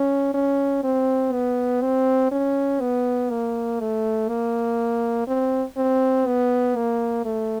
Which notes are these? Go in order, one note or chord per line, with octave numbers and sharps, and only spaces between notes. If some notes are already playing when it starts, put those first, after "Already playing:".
Already playing: C#4
C#4
C4
B3
C4
C#4
B3
A#3
A3
A#3
C4
C4
B3
A#3
A3